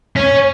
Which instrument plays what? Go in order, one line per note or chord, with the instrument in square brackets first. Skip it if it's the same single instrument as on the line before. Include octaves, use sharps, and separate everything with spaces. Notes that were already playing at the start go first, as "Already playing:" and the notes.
[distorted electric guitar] C#4